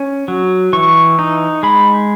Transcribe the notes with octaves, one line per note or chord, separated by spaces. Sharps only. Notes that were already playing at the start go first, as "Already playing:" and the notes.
Already playing: C#4
F#3
E3 C#6
D#4
G#3 B5